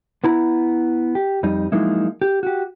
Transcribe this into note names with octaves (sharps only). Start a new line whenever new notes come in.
B3 E4 A#5
G4
F2 G3 D#4
F3 F#3 G#3 A#3 D#4 E4
G4
F#4 G4